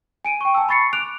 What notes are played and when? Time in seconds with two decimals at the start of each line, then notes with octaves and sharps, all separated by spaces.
0.25 G#5 D7 D#7
0.41 G5 C#6
0.54 G#5 A5 E6
0.69 B5 C#6 A6 C7 C#7
0.93 D6 F#6 D7 F7